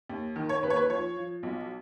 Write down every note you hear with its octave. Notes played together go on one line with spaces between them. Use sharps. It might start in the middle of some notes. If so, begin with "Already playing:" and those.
D#2
D#3
C#5
D#2 B4
C#5
B4
F3 C#5
F3
B1